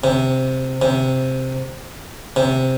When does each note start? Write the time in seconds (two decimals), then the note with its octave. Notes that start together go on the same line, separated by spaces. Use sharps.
0.04 C3
0.82 C3
2.36 C3